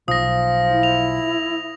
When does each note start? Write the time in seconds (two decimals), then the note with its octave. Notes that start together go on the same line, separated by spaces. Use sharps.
0.08 B1 F3 D#6 A#6
0.70 E4
0.83 F7